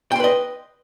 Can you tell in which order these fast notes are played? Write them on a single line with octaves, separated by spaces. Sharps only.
G5 C6 B4 D#5